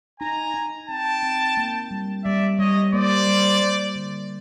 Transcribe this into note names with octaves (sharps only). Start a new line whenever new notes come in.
D#4 G#5 A#5
D#4
C4 G5 A5
C4
A#3
G3
G3 D5 E5
G3 C#5 D#5
A#3 C5 D5
G3
G3
D3